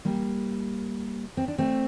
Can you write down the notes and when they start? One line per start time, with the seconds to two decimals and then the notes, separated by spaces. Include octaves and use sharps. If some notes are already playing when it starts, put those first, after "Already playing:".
0.05 G3 A#3
1.37 C4
1.48 D4
1.58 A3 C4